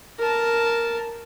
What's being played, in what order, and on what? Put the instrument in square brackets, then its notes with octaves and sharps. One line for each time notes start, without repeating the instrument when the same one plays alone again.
[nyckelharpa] A#4 A5